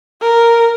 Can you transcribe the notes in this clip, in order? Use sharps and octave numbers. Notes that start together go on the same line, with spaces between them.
A#4